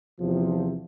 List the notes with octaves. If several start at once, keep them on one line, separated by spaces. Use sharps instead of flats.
E2 C3 F3